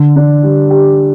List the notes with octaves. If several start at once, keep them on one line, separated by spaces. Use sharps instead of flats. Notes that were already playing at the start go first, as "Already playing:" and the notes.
Already playing: D3
D4
G3
G4